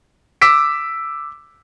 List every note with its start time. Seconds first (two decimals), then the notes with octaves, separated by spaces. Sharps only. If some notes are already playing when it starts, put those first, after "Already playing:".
0.41 D6 E6 B6 D7